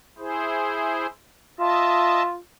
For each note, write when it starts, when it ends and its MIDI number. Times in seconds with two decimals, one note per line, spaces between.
0.18 1.07 64
0.18 1.07 68
0.18 1.07 72
1.60 2.38 65
1.60 2.23 75
1.60 2.23 76
1.60 2.23 81